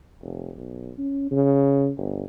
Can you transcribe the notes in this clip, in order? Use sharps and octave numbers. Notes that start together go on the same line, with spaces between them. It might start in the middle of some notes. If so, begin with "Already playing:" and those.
F1
B1
C#4
C#3
G1